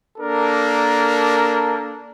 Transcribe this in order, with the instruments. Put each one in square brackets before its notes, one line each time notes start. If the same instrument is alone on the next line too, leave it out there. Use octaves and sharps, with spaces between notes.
[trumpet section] A#3 D4 A4 A#4